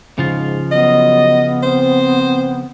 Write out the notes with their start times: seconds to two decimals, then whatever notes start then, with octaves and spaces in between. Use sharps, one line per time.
0.18 G#2 C#3 F3 F4
0.72 F#3 B3 D#5
1.63 C4 C5